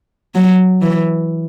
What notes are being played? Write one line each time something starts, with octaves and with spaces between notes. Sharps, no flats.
F#3
E3